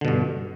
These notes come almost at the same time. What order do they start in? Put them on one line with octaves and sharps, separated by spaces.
D3 B2 G2